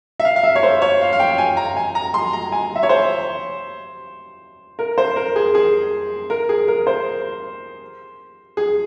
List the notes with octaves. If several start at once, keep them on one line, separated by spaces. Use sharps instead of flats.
E5
F5
F5
E5
C#5
C5
C#5
F5
F5
G5
G#5
A#5
G#5
A#5
C6
A#5
G#5
E5
C#5
C5
A#4
C5
A#4
G#4
G#4
A#4
G#4
A#4
C5
G#4